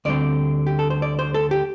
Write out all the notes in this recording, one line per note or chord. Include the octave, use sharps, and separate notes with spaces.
D2 D3 G3 C4 D5
G4
A4
C5
D5
C5
A4
G4